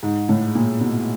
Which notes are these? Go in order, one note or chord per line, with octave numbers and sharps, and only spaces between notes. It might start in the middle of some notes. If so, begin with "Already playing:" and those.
G#2
A2
A#2
B2